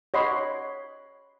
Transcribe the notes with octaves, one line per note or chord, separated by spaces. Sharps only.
C#5 D#5 F#5 B5 C6